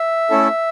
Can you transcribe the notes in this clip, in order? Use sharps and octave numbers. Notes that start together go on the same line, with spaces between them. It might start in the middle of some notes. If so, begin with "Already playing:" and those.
Already playing: E5
A3 C#4 E4 A4